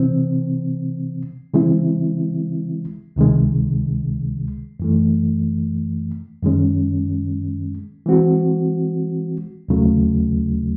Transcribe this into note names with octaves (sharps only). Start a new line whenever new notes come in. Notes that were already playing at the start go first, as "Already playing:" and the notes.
Already playing: C3 E3 C4
C#3 E3 G#3 C4 E4
C#2 C3 D#3 G#3
F#2 E3 A3
F#2 D#3 G#3 C#4
E3 G#3 C4 F#4
D#2 C#3 F#3 A3